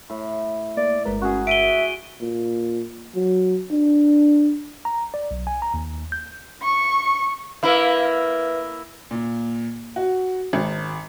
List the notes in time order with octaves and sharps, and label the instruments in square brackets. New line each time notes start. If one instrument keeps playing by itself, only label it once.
[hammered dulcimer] A2
[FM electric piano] A#3 [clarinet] D5
[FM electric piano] G1 G#3 A#4 [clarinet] B4
[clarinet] C#4 [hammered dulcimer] F#4 G#4
[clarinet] E5 [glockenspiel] D7 D#7 G7
[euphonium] A#2
F#3
D4
[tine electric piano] A#5
D5
B1
G#5
A#5
D#2
G6
[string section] C#6
[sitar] A#3 E4 [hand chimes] B4 E5
[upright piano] A#2
F#4
G#1